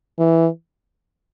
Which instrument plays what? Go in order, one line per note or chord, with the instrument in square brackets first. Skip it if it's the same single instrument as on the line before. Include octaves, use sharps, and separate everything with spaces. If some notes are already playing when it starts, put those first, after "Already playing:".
[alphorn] E3